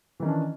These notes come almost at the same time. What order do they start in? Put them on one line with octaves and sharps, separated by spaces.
E3 D#3 C#4 D4